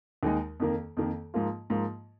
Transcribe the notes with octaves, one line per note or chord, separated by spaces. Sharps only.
D#2 D#3 G#3 D#4
F2 D#3 A#3
F2 D#3 A#3
G#2 F3 A#3 F4
G#2 F3 A#3 F4